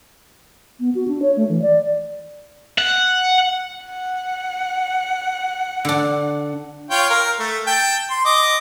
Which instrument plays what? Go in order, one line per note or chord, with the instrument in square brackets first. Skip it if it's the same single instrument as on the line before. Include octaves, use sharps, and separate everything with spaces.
[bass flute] B3
F#4
D4
C#5
A3
E3
D5
[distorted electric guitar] F#5
[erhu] F#5
[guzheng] D3 D4
[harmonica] F4 C#5 G5
A#4 F5
A3
G5 A5
C6
D#5 D6